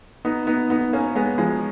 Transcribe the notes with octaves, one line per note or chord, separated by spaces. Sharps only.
B3 D#4
B3 D#4
B3 D#4
A#3 C#4
G#3 B3
F3 G#3